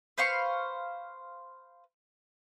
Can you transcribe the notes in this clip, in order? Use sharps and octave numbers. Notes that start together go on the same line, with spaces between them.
B4 C5 F5 C#6